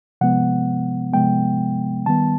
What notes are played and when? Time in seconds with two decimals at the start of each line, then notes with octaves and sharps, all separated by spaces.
0.21 C3 F3 G#3 B3 F#5
1.13 C3 F3 G#3 B3 G5
2.06 D#3 G3 B3 A5